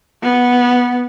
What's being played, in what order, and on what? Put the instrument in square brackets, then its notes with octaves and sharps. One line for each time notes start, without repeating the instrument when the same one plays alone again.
[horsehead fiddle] B3